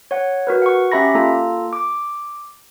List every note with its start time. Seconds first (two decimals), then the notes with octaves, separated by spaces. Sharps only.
0.11 C#5 F#5
0.47 F#4 A#4 B4
0.62 F#5 C#6
0.92 C#4 G4 E5 A#5 B5 A#6
1.15 A#3 F4 A4 A#5
1.73 D6